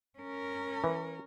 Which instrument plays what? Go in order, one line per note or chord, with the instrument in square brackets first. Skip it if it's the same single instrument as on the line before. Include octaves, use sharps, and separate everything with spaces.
[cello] C#4 A#4
[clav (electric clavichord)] E3